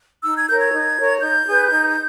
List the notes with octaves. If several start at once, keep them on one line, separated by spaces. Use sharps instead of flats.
D#4 E6
G#6
A#4 C#5 G6
G#6
D#4
A#4 C#5
D#4 G6
G#4 B4
D#4